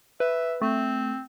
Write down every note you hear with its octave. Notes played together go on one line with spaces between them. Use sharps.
B4 E5
A3 C4